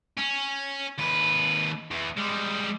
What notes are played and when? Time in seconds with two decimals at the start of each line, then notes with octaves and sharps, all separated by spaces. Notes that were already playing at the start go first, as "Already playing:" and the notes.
0.17 C#4
0.99 D#2 B4
1.91 E2
2.18 G3 G#3